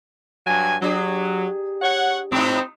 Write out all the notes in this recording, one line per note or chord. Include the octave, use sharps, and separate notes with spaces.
G2 F#3 G#5
F#3 D4 G4 G#4
C#5 F#5
G#2 C4 D#4